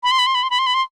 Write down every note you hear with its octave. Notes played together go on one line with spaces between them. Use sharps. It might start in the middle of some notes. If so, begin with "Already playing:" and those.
B5
C6
B5
C6
B5
C6
B5
C6
B5
C6